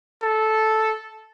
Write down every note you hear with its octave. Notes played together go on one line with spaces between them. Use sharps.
A4